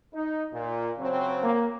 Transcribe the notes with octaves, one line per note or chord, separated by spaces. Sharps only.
D#4
A#2
C#3 F#3 C4
A#3